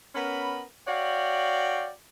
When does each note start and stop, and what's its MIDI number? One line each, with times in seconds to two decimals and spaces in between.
0.15 0.63 59
0.15 0.63 61
0.15 0.63 70
0.15 0.63 83
0.87 1.90 66
0.87 1.90 73
0.87 1.90 74
0.87 1.90 77
0.87 1.90 79